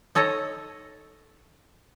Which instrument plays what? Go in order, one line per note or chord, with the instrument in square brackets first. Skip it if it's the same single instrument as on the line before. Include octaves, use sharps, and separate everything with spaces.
[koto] D#4 A4 C#5 D#5 A#5